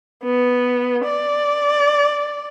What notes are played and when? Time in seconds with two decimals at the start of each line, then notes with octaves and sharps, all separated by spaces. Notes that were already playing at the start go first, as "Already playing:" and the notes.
0.23 B3
1.04 D5